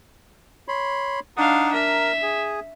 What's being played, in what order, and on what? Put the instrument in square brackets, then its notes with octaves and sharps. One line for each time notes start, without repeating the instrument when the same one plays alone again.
[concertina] C#5 B5 C6
[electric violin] D4 F5 [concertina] D#4 F#5 D#6
[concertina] A#4 A#5 [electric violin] E5
[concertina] G#4